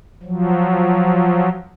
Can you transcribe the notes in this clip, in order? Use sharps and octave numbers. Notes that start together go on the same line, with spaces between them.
F3 F#3